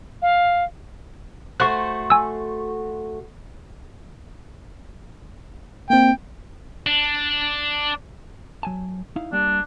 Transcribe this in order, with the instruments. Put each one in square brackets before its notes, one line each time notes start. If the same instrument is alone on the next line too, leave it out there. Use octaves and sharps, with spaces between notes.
[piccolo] F5
[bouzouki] A3 F#4 C5 [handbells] C#6 F#6
[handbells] G#5 E6
[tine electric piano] A#3 C4 [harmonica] G5
[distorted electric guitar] D4
[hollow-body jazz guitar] F#3 G#5 A5
D#4 E4 F5
[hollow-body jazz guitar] G3 A#3 [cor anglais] D4